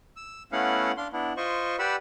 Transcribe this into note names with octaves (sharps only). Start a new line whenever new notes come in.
E6
A3 B3 C#4 E4 F5 F#5
D4 F5 C6
B3 D4 E4
F4 C5 D#5 C#6
G4 B4 D5 F#5 B5 E6